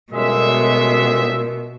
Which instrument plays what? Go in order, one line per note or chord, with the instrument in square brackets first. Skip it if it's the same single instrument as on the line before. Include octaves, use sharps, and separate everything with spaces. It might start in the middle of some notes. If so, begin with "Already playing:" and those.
[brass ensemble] G1 F#2 E5 [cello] B2 [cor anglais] G#3 [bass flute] A#4